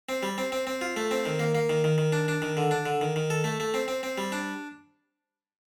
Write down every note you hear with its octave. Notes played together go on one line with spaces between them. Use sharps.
C4
G3
C4
C4
C4
F4
A3
C4
D#3
A#3
A#3
D#3
D#3
D#3
D4
D4
D#3
D3
D4
D3
D#3
D#3
A4
A3
A3
C4
C4
C4
G3
D4